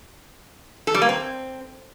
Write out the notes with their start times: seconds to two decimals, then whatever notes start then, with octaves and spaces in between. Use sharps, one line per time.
0.87 A4
0.94 G3
1.02 A#3
1.09 C4